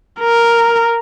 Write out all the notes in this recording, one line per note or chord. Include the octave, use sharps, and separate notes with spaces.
A#4